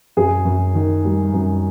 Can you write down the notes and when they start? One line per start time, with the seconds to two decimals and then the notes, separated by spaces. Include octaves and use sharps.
0.17 F#2 G#4
0.45 F#2
0.75 D#3
1.05 G3
1.34 F#2